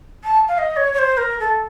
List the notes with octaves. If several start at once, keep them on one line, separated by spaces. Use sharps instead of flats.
A5
F5
D#5
C#5
C#5
C5
A#4
A4